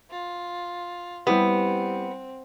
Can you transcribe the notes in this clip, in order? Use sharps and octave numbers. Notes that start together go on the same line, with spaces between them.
F4
G3 B3 C4 E4 G4